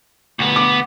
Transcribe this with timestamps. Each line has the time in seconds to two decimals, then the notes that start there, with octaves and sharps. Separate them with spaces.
0.39 D2 B3
0.56 D6